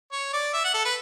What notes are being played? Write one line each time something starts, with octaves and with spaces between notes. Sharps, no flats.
C#5
D5
E5
F#5
A4
B4